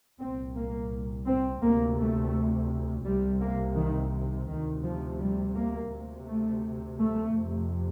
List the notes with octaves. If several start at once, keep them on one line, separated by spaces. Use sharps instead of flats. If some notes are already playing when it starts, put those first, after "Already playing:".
C2 A#2 C4
A#3
C4
D2 C3 A#3
A3
C2 C3 G3
A#3
D#3
D2 C3 D#3
F3
G3
A#3
D2 C3
A3
A3
F2 C3